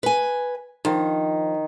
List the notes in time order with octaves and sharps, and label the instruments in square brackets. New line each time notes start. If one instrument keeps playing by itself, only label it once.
[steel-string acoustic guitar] B4 G#5
[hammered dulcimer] D#3 [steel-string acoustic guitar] F3